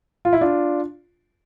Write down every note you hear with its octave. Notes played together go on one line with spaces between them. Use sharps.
F4
E4
D4 F4